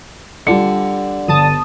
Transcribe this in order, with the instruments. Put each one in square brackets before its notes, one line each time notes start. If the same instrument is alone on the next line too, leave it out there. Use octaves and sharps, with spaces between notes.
[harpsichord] D3 [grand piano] G3 F4 C#7
[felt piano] G1 [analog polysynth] A5 D#6